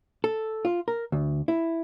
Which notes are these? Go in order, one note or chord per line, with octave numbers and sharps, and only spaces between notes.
A4
F4
A#4
D2
E4